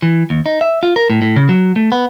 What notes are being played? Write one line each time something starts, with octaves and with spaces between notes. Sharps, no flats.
E3
D#2
D#4
E5
F4
A#4
A2
A2
C#3
F#3
A3
B3